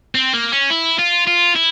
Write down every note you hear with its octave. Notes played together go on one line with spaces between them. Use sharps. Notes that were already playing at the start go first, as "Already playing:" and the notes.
C4
A#3
C#4
E4
F4
F4
E4